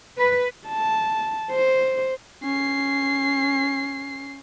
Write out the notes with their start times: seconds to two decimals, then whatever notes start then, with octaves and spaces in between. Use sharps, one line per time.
0.18 B4
0.68 A5
1.51 C5
2.43 C#4 C7